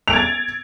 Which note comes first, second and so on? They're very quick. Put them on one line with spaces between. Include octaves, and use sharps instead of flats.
F7 D7 G#6 A6